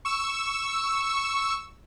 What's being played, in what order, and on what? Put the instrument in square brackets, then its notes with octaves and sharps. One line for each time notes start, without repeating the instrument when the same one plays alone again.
[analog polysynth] C#6 E6